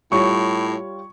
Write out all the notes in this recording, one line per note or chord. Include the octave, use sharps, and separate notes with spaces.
A2 G3 F4 C#5 C#6